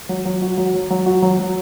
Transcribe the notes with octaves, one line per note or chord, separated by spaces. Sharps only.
F#3
F#3
F#4
F#3
F#3
F#3
F#4
F#3
F#3